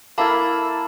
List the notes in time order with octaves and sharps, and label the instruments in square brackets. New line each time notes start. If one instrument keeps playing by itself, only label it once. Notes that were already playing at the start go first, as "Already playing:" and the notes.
[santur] A#3 E4 A4 [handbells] F5 A5 B5